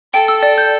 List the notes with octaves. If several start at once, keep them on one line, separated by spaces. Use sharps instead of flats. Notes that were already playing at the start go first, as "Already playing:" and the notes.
A4 G5
E6
D5
G6